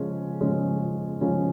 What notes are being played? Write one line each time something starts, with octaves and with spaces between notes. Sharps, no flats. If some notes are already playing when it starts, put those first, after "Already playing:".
Already playing: C#3 F3 G#3 C#4
C#3 F3 G#3 C#4
C#3 F3 G#3 C#4